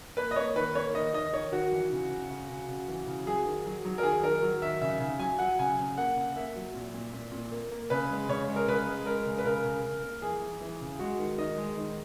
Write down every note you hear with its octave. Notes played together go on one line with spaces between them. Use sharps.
A#3 B4
D#5
A#3 C#5
D#3 B4
A#3 C#5
D#3 D#5
D#3 D#5
D#3 C#5
D#3 F#4
E3
C#3
C#3
C#3
C#3
C#3
E3
C#3
F#3 G#4
D#3
F#3
F#3
A#4
D#3 G#4
D#3 A#4
F#3
D#3 E5
C#3 E5
C#3
F#3 G#5
F#3 F#5
C#3 G#5
C#3
A#3 F#5
C#3
A#3 E5
F#3
A#2
A#2
A#2
A#2
A#3
A#3
C#3 B4
G#3
C#3 C#5
G#3
A#4
C#3 B4
G#3
G#3 A#4
C#3
B4
C#3 A#4
C#3
C#3
A#3
E3 G#4
E3
E3
C#3
G#3 F#4
D#3
D#3 D#5
G#3
D#3